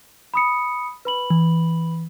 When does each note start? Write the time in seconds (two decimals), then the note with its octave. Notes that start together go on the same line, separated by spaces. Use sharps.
0.34 B5 D#6 C#7
1.05 B4 B5 F#7
1.30 E3